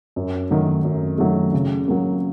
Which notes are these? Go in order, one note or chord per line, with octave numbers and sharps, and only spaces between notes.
F#2
D#3 F#3 A3
F#2
D#3 F#3 A3
C#3
F#3 A#3